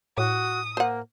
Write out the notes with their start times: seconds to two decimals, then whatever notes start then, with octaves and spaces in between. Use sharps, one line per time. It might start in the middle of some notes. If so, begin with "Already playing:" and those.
0.18 A2 F#4 D#6
0.77 A#3 C5 F#5